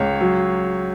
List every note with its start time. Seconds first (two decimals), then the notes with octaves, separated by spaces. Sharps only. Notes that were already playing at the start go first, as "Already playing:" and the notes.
Already playing: C#2 C#5
0.20 F#3